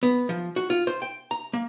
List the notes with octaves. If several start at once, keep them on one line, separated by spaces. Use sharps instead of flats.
B3
F3
F#4
F4
C5
G5
A#5
A#3